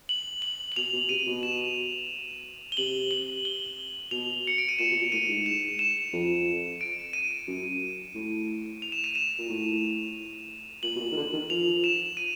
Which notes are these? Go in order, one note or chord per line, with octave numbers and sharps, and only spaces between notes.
F#7
F#7
F#7
B2 F7
B2
C3 D#7
B2
E7
G7
C3 F#7
F#7
G7
B2 F7
C#7
D7
D#7
A#2 E7
B2
A#2
A2 D#7
G#2
E7
E7
F2
D7
D#7
F#2
A2
F7
E7
D#7
E7
A#2
A2
A#2 F#7
B2
A#2
D#3
D3
D#3
F3 F7
E7
D#7